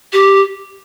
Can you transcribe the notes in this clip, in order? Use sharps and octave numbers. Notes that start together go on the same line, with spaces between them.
G4